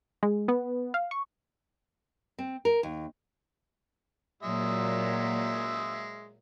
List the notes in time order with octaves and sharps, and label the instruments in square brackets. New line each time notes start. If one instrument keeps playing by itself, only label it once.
[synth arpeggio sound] G#3
B3
F5
C#6
[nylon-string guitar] C4
A#4
D#2
[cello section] A#2 F#3 [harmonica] G#3 E5